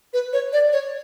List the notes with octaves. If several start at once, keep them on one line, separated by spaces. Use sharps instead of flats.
B4
C#5
D5
C#5